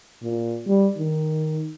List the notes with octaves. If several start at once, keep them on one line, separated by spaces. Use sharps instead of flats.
A#2
G3
D#3